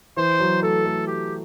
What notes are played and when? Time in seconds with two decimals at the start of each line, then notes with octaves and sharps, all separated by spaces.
0.17 E3 C5
0.40 F#3
0.62 A3 A4
0.85 A3
1.07 G4